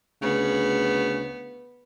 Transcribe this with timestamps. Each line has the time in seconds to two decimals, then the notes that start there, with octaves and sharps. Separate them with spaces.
0.22 D2 C#3 B3